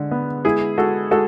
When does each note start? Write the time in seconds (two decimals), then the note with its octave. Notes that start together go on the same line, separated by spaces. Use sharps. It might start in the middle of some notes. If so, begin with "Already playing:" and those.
Already playing: D3 G#3
0.11 B3
0.45 G#3 E4 G#4
0.78 G#3 F#4 A4
1.11 G#3 F#4 A4